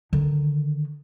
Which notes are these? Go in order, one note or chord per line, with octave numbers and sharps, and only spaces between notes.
D3 D#3